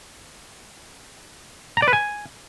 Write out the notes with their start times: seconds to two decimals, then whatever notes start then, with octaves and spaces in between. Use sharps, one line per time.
1.77 A#5
1.82 D5
1.88 B4
1.93 G#5